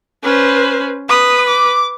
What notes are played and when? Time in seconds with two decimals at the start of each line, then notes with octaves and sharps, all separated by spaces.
0.23 C#4 B4 C5
1.09 B4 D#6
1.48 D6